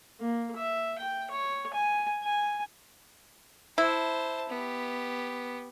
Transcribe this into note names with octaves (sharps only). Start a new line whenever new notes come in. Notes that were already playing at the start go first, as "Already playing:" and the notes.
A#3
E5
G5
C#5
G#5
G#5
E4 C5 A5
B3 G4